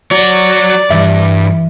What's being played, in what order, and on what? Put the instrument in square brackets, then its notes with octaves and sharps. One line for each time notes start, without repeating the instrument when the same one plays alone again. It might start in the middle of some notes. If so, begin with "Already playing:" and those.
[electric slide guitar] F#3 F#4 [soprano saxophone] D5
[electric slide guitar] G2 [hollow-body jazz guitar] E3 E5